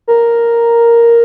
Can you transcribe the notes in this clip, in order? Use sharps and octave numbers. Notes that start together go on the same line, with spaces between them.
A#4